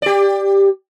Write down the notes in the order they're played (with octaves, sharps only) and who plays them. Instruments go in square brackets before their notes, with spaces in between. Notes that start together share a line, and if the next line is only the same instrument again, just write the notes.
[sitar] G4 D5